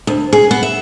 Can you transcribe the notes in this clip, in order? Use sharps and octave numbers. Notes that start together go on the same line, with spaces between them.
D2
G#4
B3
E5